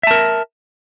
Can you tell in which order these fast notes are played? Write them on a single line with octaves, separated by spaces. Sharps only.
E5 A5 A#4